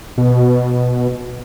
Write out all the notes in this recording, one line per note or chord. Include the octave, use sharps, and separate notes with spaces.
B2